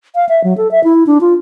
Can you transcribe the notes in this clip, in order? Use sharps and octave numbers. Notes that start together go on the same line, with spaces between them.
F5
E5
F#3
A4
E5
E4
D4
F4